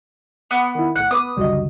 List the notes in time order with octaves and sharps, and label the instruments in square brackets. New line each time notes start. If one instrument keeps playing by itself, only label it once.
[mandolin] B3
[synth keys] D#3 E4
[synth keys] B1 A2 [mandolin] F#5
[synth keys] B3 B4 [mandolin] D#6
[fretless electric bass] C#2 F#2 D3 [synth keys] G3 F#4 D#5